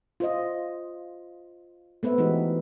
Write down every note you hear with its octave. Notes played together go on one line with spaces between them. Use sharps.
F4 C5 D#5
A3 B3 B4 C5 E5
E3 G#3 D#4 F#4 G4